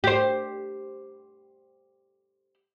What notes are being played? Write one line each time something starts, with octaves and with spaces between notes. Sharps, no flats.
G4 C5